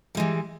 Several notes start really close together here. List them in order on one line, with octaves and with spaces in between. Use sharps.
G3 G#3 E3